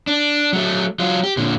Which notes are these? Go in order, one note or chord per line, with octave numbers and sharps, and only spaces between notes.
D4
F#3 A3
F#3 F4
G4
A#2 D3